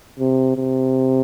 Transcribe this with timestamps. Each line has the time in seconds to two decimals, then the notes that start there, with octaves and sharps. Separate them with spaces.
0.20 C3
0.57 C3